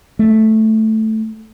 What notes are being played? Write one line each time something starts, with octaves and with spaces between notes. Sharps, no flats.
A3